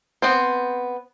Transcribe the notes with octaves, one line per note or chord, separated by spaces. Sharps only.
B3 C4 C5